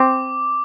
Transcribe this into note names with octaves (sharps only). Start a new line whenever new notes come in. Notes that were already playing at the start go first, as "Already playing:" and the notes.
Already playing: C4 D6